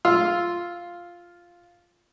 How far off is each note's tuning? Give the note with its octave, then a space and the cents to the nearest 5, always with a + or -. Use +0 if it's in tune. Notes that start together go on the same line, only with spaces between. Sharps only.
F4 +0 E6 +0